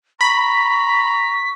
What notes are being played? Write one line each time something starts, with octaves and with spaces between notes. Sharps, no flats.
A#5 B5 C#6 B6